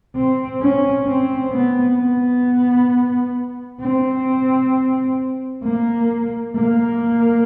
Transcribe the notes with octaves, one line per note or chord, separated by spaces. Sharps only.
C4
C#4
C4
B3
B3
C4
A#3
A#3